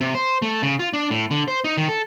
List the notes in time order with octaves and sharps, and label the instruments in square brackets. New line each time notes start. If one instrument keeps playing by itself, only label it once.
[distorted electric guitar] C3
C5
A3
C#3
F4
D4
A2
D3
C5
D#4
D#3
A4